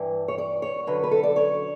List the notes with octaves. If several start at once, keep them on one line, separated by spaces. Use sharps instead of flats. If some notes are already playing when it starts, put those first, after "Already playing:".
Already playing: G2 E3
C#5
D5
C#5
F#2 D3 F#3 B4
B4
A4
D5
C#5